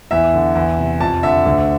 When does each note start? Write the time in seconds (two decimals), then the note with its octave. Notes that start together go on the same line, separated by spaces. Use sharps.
0.11 E2 E5
0.34 D3
0.55 E2
0.78 C3
1.00 F2 A5
1.23 D3 E5
1.46 D2